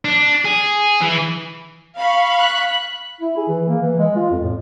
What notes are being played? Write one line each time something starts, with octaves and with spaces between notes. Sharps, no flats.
D4
G#4
E3
F5 B5 C#6
F#6 B6
E4
G#4
E3
A#3
E3
G#3
F4
F2
A2